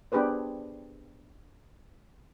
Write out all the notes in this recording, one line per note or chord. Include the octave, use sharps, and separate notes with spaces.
B3 D4 G4 G#4 B4 C5